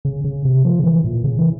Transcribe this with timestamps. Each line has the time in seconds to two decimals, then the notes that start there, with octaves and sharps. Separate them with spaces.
0.05 C#3
0.24 C#3
0.45 C3
0.65 F3
0.79 C#3
0.84 E3
1.04 A#2
1.24 C#3
1.39 E3